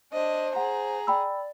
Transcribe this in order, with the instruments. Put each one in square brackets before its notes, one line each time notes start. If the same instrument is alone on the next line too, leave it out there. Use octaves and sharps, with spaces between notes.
[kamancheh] D4 D#5 [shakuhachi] C5
[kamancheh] G#4 A#5 [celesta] F#5
[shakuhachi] D5 [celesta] G5 B5 E6